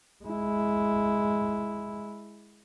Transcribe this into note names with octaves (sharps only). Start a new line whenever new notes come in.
G#3 E4